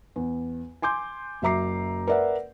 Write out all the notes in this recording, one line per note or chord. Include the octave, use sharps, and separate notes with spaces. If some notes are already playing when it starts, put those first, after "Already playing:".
E2
G#5 C6 D6 G6
F#1 F#3 E5 A#5 D6 C7
A#4 B4 D5 E5 F#5